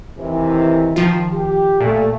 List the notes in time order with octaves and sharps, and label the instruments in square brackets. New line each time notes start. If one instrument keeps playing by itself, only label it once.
[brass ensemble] C3 D#3 E3
[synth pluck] D#3 F3 F4
[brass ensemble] G4
[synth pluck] A#2 [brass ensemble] A3